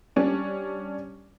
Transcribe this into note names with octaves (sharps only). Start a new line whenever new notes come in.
G3 C#4 D4